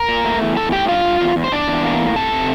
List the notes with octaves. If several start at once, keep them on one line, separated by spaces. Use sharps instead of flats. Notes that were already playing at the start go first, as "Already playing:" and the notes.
Already playing: A#4 A#5
A#2
A3
E2
A2 A4 A5
A2 G4 G5
G2 F4 F5
G2
E2
E2
C5
E2 D4 D5
E2
A#3
A2
C3 A4 A5
C3